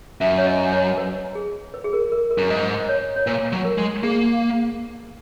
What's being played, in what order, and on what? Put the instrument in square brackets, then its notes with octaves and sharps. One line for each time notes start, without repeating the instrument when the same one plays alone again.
[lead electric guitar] F#2 [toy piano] E5
[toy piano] C#5
D#5
C#5
B4
G#4
B4
G#4
A#4
A#4
A#4
[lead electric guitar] F#2
[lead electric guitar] G#2 [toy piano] D#5
[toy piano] C#5
C#5
[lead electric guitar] A#2 [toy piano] B4
[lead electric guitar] F#3
[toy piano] A#4
[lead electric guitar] G#3
[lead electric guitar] A#3 [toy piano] G#4